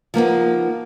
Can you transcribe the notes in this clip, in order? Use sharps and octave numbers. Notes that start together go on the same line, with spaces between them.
F3 A#3 B3 D#4